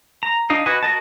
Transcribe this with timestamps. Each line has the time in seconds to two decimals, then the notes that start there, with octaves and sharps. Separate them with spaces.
0.23 A#5
0.50 D4 D#4 D#5 F5
0.66 F#4 B4 D#5 F#5 G#5
0.83 F#4 A#4 D#5 A5